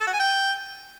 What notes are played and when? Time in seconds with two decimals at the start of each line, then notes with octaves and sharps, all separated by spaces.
0.01 A4
0.07 F#4
0.13 G#5
0.20 G5